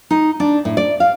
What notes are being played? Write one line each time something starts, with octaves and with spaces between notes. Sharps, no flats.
D#4
D4
A2
D5
F5